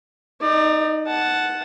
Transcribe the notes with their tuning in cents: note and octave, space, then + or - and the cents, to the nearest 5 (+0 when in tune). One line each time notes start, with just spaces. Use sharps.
D#4 +0 D5 +30
F#5 +0 A5 -10